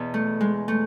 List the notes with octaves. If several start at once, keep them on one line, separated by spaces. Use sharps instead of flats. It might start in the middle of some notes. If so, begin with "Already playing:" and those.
Already playing: E2 B2
A3
G#3
A3